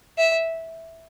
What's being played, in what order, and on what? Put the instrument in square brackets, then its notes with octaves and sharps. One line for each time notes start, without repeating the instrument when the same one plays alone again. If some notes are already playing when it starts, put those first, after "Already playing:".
[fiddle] E5